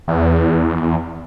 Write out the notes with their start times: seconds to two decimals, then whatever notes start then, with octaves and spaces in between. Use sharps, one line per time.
0.08 E2